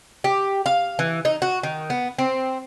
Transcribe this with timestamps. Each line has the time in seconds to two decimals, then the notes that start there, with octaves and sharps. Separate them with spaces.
0.24 G4
0.66 F5
0.99 E3
1.25 D#4
1.42 F#4
1.63 D#3
1.90 B3
2.18 C4